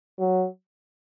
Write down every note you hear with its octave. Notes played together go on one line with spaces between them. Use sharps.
F#3